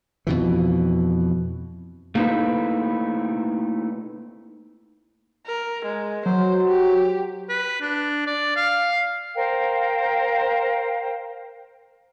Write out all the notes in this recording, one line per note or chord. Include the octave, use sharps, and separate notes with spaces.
F2 B2 E3
A3 A#3 C4 D#4 E4 B4
A#4
G#3
F#3 C5
G4
B4
D4
D5
F5
A#4 C5 F5 G5